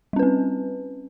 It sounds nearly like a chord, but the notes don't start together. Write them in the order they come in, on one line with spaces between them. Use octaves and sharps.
G3 C#4 B4 C4